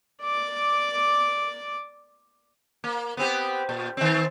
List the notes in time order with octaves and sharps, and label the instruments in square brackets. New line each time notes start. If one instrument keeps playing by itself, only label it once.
[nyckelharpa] D5 D6
[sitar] A#3
B3 C4 G4
A#2
D#3 C4